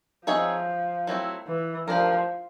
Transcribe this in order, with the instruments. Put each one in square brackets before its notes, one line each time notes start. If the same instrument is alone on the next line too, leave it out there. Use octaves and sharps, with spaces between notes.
[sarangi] F3 [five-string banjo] C4 D#4 G#4 C#5 E5
[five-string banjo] F#3 A3 C4 E4
[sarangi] E3
[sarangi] F3 [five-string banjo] A3 D4 G4 A#4